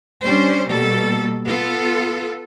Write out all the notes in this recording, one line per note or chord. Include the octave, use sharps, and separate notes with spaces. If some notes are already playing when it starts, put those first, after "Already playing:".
G3 C#4 D4 C5
B2 G3 A#3 A4
B3 F4 A4